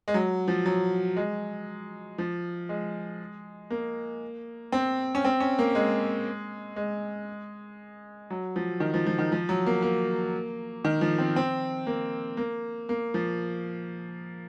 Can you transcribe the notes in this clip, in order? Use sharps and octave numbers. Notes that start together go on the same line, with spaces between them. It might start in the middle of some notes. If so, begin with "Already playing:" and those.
G#3
F#3
F3
F#3
G#3
F3
G#3
A#3
C4
C#4
C4
C#4
A#3
G#3
G#3
F#3
F3
D#3
F3
F3
D#3
F3
F#3
A#3
A#3
D#3
F3
C4
C4
A#3
A#3
A#3
F3